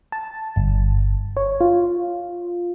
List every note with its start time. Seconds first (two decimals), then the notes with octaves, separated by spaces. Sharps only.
0.12 A5
0.56 G1
1.37 C#5
1.61 F4